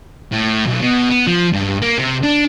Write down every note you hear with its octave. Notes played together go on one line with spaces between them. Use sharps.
A2
B1
B2
B3
F3
G2
A#3
C3
D4